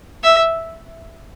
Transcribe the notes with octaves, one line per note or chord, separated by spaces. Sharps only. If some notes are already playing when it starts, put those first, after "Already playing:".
E5